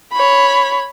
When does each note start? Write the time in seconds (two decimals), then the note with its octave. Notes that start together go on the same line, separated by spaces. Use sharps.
0.13 C#5 B5